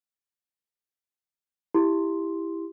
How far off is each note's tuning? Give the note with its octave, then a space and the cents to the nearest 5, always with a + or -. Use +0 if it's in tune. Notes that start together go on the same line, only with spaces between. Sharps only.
E4 +0 G4 +15 C6 +0